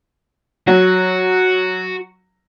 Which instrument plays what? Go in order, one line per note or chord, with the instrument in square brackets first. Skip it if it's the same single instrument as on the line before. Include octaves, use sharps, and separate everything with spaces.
[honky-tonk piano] F#3 [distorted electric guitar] F#4